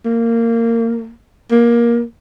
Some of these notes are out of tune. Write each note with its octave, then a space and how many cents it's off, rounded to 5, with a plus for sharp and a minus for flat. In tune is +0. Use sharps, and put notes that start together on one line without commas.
A#3 -20
A#3 +15